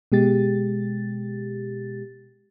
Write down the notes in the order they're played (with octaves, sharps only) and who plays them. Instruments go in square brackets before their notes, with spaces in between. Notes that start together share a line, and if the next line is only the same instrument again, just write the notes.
[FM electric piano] B2 G#3 G4 A6